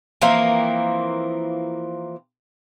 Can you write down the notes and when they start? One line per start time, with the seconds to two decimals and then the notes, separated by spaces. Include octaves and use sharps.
0.22 E3 F3 A#3 C4